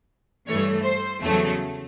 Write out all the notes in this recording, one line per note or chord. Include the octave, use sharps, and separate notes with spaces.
G2 E3 A3 C#5
C5
E2 C#3 F#3 A3